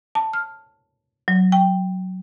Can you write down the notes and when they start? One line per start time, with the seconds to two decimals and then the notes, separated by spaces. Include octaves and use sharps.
0.15 A5
0.33 F6
1.28 F#3
1.52 G5